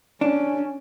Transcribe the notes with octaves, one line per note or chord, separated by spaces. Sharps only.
C#4 D4